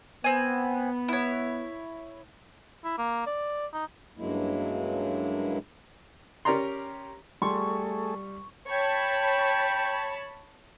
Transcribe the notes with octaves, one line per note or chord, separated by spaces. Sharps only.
B3 C4 G#5
E4 C#5
E4
A#3
D5
D#4
G2 C#3 F#3 G#3 A#3 E4
C#4 G4 A#4 D5 A#5 C6
G3 A3 G#4 A4 C#6
C#5 G5 A5 B5